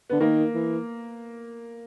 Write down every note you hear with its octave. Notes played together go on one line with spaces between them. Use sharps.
D3 B3
D#3 A#3
E3